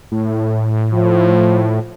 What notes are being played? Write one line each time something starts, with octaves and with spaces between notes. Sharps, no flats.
A2
F3